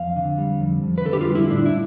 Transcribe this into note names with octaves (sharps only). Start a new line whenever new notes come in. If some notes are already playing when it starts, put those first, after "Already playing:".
Already playing: F2 F5
D3
G3
F2
F2
B4
D3 A4
G4
F4
G3
E4
A2 D4
E4